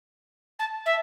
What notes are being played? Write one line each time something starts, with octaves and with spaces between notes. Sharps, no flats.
A5
E5